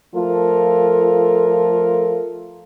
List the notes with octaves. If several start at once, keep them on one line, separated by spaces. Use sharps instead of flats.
F3 A3 F4 A4 A#4